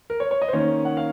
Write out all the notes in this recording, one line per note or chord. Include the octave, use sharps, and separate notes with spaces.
A#4
C#5
C#5
D#5
C5
D#3 A#3 C#4 C#5
F#5
F5